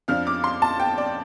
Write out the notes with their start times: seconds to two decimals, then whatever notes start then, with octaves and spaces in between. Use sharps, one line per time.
0.08 F2 F3 D4 F6
0.27 D6
0.44 C6
0.62 A5
0.80 G5
0.98 D5